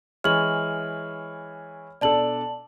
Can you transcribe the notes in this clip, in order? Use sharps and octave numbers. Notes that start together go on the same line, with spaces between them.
E3 G#3 C#5 F6 F#7
B2 D4 A4 D5 A5 F#7